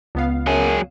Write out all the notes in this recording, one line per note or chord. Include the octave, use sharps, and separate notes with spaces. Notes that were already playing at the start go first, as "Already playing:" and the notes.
C#2 B3 F5
F#2 F#3 G#4